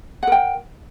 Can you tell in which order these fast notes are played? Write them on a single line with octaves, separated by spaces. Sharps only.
F#5 A#4 G5